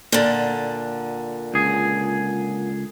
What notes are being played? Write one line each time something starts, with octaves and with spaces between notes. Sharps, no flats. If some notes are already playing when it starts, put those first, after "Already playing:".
A#2 D3
C#2 G#4